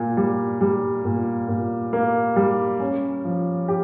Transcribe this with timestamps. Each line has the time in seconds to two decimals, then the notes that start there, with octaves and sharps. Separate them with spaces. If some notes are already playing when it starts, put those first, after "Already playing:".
Already playing: A#2 A#3
0.17 G3
0.61 G3
1.05 A#2
1.48 A#2
1.93 A#3
2.36 G3
2.80 C#4
3.24 F3
3.68 G4